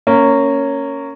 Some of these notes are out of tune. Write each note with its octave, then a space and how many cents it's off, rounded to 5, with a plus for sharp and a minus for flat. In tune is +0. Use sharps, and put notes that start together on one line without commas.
A#3 -15 C#4 +0